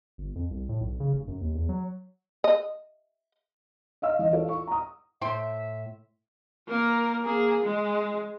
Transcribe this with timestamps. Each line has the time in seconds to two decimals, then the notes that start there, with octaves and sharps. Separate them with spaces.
0.18 G1
0.35 F2
0.51 C2
0.69 A2
0.81 B1
1.00 C#3
1.13 F1
1.28 F#2
1.41 D#2
1.55 E2
1.69 F#3
2.44 D#5
4.02 D#5 F5 E6
4.19 E3 D#5
4.33 E4 F4 A4 C#5 F5
4.49 C#6
4.67 A#5 D#6
5.21 A2 C5 E5 G5 C6
6.68 A#3 A#4
7.24 A#3 G#4
7.63 G#3